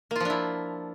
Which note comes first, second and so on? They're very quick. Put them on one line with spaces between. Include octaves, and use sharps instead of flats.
A#3 F4 F3 D4 E4